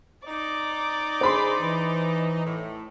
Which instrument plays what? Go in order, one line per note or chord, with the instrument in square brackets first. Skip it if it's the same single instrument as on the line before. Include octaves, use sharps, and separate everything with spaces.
[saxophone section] D#4 [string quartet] D5 D6
[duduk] G#4 [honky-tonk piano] C5 B5 C6
[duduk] E3
[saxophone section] A2